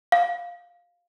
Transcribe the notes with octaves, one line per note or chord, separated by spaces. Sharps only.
F5